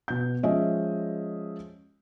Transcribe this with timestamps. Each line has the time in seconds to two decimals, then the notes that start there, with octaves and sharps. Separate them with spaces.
0.08 B2 G6
0.43 F3 G#3 C#4 D#5 E5